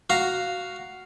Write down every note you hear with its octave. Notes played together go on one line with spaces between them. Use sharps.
F#4 F5 A#5